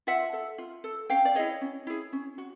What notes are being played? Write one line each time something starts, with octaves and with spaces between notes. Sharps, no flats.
F4 E5 F#5
A4
F4
A4
C#4 F5 G5
D5
E4 G#4 C#5 D#5
C#4
E4 G#4
C#4
F#4